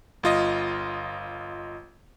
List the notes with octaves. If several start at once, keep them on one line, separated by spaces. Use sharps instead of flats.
G1 F4 D#5